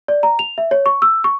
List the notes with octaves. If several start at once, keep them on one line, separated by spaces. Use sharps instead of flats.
D5
A#5
F7
E5
C#5
C#6
E6
C#6